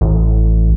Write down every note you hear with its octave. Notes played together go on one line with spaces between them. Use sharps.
A1